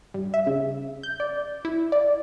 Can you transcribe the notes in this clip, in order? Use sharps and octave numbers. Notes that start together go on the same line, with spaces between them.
G2
E5
C#3
G6
D5
E4
D5